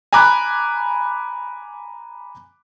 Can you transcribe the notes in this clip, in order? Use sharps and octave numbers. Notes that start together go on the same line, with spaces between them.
G#5 A#5 B5 D6 F#6